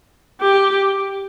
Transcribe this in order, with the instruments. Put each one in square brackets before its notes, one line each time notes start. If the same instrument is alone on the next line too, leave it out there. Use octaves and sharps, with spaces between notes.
[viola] G4